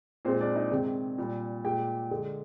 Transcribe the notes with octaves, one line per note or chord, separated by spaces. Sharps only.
A#2 G#3 C4 C5
D4 D5
D#4 D#5
C3 D#3 G#3
A#2 G3
A#2 G#3 G4 G5
D3 G#3